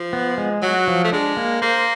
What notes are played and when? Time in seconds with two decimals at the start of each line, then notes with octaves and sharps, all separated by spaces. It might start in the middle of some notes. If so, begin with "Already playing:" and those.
Already playing: F3
0.13 B3
0.38 G#3
0.62 F#3 F#4
0.87 F3
1.04 A3
1.12 G#3 D4
1.37 A#3
1.62 A#3 C5